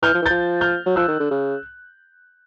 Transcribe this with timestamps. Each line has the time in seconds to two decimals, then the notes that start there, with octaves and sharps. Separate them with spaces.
0.03 E3 F6 G6
0.14 F3
0.22 E3
0.26 F3 G6 A6
0.61 F6 G6
0.86 F#3
0.96 F3 E6 F#6
1.08 D#3
1.20 D3
1.31 C#3